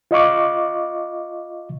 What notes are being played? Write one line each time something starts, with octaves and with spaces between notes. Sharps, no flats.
F4 D#5 F5 C#6 D6